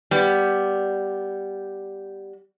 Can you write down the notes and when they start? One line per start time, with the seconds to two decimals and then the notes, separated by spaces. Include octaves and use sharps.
0.11 G3 B3